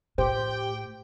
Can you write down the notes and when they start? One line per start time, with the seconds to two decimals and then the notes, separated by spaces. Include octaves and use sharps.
0.18 A2 G4 C5 G5